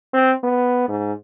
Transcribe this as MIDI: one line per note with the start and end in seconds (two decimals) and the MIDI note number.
0.13 0.33 60
0.43 0.86 59
0.88 1.13 44